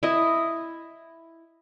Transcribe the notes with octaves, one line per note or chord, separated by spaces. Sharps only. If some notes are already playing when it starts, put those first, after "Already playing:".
E4 D#5